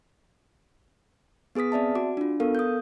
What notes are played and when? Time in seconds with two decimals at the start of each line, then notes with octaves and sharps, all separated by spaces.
1.55 B3 G#4 B4 D#6 B6
1.72 C4 D5 E5 A5
1.95 F#4 D6
2.17 D4 F4
2.40 B3 A4 A#4 F5
2.55 D#6 G6